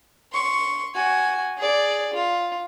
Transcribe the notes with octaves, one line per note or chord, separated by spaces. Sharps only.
C6 C#6
F#4 G#5
G#4 D5
F4